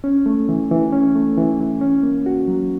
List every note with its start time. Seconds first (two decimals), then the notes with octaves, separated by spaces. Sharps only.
0.04 C#4
0.26 A3
0.49 E3
0.71 E3
0.92 C#4
1.16 A3
1.37 E3
1.60 E3
1.81 C#4
2.03 A#3
2.26 F#4
2.48 F#3